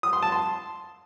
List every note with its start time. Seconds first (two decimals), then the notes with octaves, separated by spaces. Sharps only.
0.03 D#6
0.13 C6
0.22 A5
0.32 C6